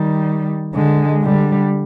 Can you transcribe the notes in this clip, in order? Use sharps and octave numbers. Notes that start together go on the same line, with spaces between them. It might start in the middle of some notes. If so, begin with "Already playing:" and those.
Already playing: D#3 G3
D3 G#3
D3 G3